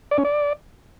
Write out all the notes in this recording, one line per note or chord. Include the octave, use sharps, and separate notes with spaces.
D5
C#4
D5